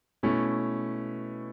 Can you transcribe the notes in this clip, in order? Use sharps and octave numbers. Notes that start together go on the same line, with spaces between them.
B2 A3 C#4 E4